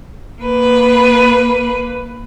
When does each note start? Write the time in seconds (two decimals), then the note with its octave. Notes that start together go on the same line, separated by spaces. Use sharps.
0.42 A#3 B4